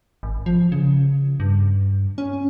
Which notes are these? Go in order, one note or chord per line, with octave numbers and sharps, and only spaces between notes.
G#1
F3
C#3
G2
C#4